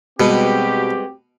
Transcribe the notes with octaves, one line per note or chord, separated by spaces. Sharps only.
B2 G3 G#3 C4 F#4 G4 B4